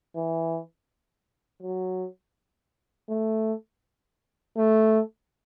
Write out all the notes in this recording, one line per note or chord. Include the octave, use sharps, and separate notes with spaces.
E3
F#3
A3
A3